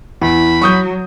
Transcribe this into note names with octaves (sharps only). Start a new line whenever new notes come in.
E2 E4 B5
F#3 C#6 D#6 G6